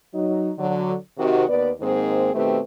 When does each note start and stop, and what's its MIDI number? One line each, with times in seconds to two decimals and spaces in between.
0.14 0.50 54
0.14 0.50 63
0.58 0.94 50
0.58 0.94 54
1.17 1.45 48
1.17 1.45 51
1.17 1.45 66
1.49 1.71 39
1.49 1.71 59
1.49 1.71 71
1.49 1.71 74
1.81 2.31 44
1.81 2.31 51
1.81 2.31 58
1.81 2.31 60
1.81 2.31 68
1.81 2.31 72
2.33 2.60 47
2.33 2.60 51
2.33 2.60 57
2.33 2.60 60
2.33 2.60 67
2.33 2.60 71